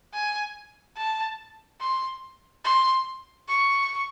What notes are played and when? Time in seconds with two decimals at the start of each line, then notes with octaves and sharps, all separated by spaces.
0.13 G#5
0.97 A5
1.80 C6
2.64 C6
3.48 C#6